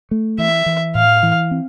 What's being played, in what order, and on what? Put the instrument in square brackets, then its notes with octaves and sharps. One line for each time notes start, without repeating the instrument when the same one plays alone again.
[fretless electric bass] A3
[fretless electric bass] E3 [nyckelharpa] E5
[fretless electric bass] E3
[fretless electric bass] A2 [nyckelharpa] F5
[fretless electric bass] E3
C4